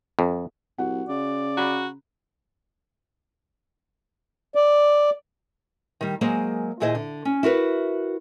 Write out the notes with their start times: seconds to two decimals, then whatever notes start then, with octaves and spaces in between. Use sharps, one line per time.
0.19 F2
0.78 C2 F#4 F#5
1.09 C#3 D5
1.57 F#4 A#5 B5
4.55 D5
6.01 D#3 G3
6.21 F#3 G#3 A#3 G#4 A#4 C5
6.80 D#2 A#2 E4 G#4 C5 D#5
6.95 D3
7.25 C#4
7.43 E4 F#4 A#4 B4